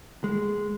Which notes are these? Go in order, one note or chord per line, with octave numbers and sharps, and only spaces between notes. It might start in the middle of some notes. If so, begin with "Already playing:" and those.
G#3